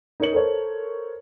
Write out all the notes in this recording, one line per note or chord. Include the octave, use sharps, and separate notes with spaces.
D#4 A#4 C#5 C#7 F#7
A4 A#4 C5 C#5